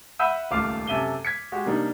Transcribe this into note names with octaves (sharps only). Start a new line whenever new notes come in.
E5 F#5 B5 E6 G6 D#7
D#1 C#2 A3 F4 F5 D6
F#2 C3 A4 E5 D#7 G7
G#6 B6 C#7
G#3 F#4 G4
C3 G3 A#3 D4 D#4